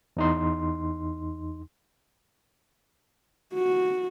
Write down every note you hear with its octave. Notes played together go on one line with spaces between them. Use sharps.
E2 D#4 C6
F#4